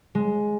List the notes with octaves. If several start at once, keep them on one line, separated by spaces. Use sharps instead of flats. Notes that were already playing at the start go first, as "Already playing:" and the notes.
G#3